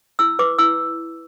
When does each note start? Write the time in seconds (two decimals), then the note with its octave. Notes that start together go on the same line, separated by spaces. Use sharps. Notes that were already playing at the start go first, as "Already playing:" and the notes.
0.19 E4 E6
0.39 B4 D6
0.59 E4 E6